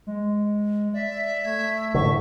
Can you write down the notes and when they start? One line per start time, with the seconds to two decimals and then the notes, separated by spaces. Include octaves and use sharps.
0.07 G#3
0.94 D5 E5
1.45 A3 G#6
1.94 A2 D3 C#6